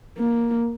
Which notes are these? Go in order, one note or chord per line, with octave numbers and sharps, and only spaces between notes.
A#3